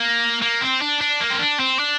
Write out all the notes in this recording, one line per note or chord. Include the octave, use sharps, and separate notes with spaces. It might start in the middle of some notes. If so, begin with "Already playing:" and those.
Already playing: A#3
A#3
C4
D4
D4
A#3
C4
D4
C4
D4